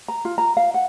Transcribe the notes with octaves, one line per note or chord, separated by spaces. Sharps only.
A#5
F4
A#5
F5
F#5